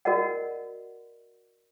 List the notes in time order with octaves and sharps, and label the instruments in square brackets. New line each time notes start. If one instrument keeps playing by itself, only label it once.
[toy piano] F#4 A#4 D5 D#5 F#5